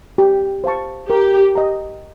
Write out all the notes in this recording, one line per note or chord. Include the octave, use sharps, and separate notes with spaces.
G4
C5 F5 A5 C#6
G4 A#4
D#5 G5 A#5